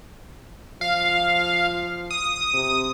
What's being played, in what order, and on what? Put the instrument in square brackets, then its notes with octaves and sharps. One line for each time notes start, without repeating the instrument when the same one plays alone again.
[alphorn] F3 [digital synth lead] F5
[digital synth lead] D#6
[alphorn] C3